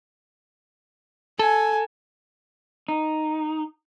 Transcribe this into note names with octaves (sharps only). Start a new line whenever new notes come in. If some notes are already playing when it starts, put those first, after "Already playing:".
A4 G#5
D#4